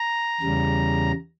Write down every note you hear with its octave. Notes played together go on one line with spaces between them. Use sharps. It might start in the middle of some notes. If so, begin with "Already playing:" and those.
Already playing: A#5
E2 C#3 G3